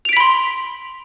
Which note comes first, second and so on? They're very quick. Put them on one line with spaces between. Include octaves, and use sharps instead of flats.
F7 D7 B6 B5 C6